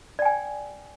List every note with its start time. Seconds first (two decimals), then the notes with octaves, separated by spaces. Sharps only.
0.19 D5
0.22 G5
0.25 G#5